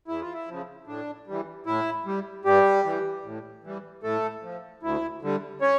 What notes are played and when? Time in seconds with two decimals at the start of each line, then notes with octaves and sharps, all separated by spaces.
0.08 E2 E4
0.21 F4
0.33 E4
0.48 C#3 F3
0.87 A2 D4
1.27 E3 G3
1.66 A2 E4
2.06 G3
2.45 G2 G3 G4
2.85 E3 G3
3.25 A2
3.64 E3 G3
4.03 A2 A3 A4
4.43 F3
4.83 D2 E4
5.22 D3 G3
5.61 C#4 C#5